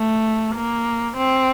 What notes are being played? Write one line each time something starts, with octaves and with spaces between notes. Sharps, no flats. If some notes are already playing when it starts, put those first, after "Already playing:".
Already playing: A3
A#3
C4